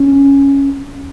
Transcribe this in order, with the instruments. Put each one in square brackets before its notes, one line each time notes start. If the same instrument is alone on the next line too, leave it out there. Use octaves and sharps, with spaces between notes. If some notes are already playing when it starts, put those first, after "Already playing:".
Already playing: [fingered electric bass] C#4